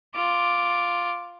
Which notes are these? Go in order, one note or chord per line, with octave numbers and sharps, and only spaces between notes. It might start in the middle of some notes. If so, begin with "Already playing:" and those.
F4 D6